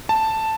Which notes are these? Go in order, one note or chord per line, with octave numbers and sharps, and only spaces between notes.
A5